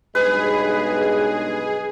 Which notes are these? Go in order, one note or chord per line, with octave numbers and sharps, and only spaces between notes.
B1 G2 G#3 G#4 B4